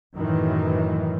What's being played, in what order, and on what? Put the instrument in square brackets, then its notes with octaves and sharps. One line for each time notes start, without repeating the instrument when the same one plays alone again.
[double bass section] F#2 A2 D#3 E3